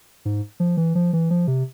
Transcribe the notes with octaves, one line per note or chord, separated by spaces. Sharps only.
G#2
F3
E3
F3
E3
F3
C3